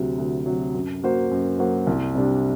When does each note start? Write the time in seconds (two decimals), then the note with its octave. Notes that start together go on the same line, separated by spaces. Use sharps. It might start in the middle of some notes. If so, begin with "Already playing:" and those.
Already playing: D2 C3 F#3
0.18 D2
0.46 C3 F#3
0.74 F#2
1.02 F#3 A#3 F#4 C5
1.31 F#2
1.59 F#3 A#3 F#4 C5
1.87 C2
2.15 C3 G3 D4